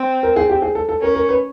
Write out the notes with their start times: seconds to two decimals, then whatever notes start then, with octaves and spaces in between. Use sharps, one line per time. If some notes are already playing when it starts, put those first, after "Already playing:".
Already playing: C4
0.23 A#4
0.36 G#4
0.49 G4
0.62 G#4
0.75 A4
0.89 A4
1.02 C#4 A#4
1.15 A#4
1.29 B4